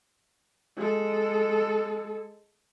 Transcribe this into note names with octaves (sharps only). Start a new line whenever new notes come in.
G#3 A4